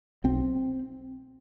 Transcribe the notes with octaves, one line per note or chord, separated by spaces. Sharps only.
B1 C4